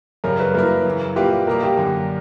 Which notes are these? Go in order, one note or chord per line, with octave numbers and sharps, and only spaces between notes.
F#2 C#3 G3 C#4 A#4
B4
G2 F#3 A#3 E4 A#4
F#2 C#3 E3
A#2 G3 A#3 E4 G4 B4
B2 G3 A#3 A#4
G4
F#2 D3 A#3